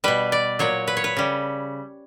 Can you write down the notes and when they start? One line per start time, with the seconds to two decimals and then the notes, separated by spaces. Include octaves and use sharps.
0.04 B2 G3 B4
0.32 D5
0.59 A#2 F#3 C#5
0.87 B4
0.97 C#5
1.04 B4
1.17 C#3 G3